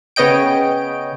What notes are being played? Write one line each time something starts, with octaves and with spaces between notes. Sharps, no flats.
C#3 B3 C#5 D#5 G5 D7